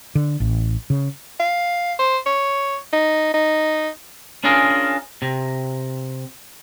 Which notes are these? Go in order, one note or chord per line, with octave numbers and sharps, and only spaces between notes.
D3
A1
C#3
F5
C5
C#5
D#4
D#4
C#4 D4 F4 G#4 A#4
C3